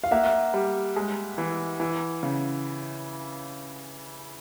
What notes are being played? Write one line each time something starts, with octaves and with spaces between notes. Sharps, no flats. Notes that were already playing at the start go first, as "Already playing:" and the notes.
F5
A#3 E5 F#5
G3
G#3
E3
E3
C#3